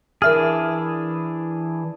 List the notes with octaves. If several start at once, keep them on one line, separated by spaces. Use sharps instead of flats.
E3 D4 G#4 A#4 E5 F6